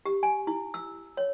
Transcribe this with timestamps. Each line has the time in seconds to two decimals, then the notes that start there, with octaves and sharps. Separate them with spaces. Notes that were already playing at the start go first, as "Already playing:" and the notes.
0.06 G4
0.23 G#5
0.47 E4
0.74 E6
1.17 C#5